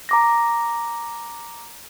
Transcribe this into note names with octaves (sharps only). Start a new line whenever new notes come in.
A#5 D6 A#6